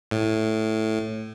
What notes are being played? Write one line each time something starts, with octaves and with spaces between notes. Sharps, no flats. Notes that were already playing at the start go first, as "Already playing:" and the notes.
A2